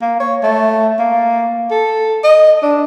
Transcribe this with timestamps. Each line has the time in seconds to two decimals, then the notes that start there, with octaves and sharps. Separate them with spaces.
0.02 A#3
0.20 C#5
0.43 A3
0.99 A#3
1.71 A4
2.24 D#5
2.63 D4